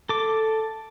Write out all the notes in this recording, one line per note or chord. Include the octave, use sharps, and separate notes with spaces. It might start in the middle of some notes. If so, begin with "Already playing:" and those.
A4 D6